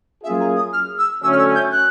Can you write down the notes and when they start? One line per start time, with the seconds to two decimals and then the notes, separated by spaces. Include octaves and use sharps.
0.23 F#3 A#3 C#4 F4 G#4 E5
0.39 A#5
0.56 D#6
0.72 F6
0.98 E6
1.22 D3 F#3 A3 C#4 E6
1.32 F6
1.38 E6
1.55 G6
1.72 F#6